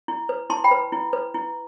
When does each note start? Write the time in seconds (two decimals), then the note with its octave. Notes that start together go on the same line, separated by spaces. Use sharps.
0.08 E4
0.29 B4
0.50 E4 A5 C6
0.64 G5 B5
0.71 B4
0.92 E4
1.13 B4
1.34 E4